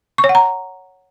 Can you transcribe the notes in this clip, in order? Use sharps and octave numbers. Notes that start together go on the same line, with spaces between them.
C#6
C#5
F#5
A#5